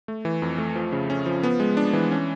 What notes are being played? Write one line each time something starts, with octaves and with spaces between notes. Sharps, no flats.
A3
E3
F2
A3
F3
C#3
C#4
F3
B3
G#3
D4
E3
C#4